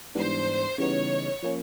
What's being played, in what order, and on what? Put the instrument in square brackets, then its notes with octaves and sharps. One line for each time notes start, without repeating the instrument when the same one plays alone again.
[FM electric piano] G#2 E3 G3 B3 D4 [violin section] C5
[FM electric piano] C#3 E3 G3 B3 D#4 [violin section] C#5
[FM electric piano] F3 A#3 C#4